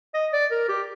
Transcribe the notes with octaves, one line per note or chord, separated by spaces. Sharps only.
D#5
D5
A#4
G4